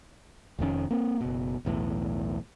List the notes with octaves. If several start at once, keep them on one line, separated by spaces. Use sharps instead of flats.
F1 F2 D#3 C#4
A#3 C4
F#1 B2
B1 E2 A2